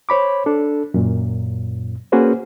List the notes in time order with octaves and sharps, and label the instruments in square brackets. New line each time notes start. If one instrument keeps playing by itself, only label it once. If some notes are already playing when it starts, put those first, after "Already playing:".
[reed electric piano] C5 C#5 B5 D6
D4 A4
F#2 A#2
A#3 C#4 F#4 G#4 B4 C5